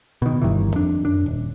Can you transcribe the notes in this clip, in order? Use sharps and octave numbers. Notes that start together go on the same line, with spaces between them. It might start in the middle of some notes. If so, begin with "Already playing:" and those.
B2 D#3
G1 G2 D#3 E3
F2 D4
F#2 D4
D#1